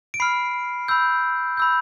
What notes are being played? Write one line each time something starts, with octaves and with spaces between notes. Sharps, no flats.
D7
B5 F6 C7
B5 E6 G6
B5 E6 G6